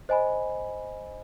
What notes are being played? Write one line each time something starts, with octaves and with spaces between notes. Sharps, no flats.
C5 D#5 G#5 B5